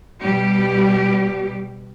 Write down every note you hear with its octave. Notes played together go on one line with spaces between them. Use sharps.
B2 G3 G4